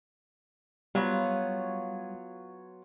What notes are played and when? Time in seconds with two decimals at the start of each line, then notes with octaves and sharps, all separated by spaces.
0.95 F#3 G3 B3 F4 C#5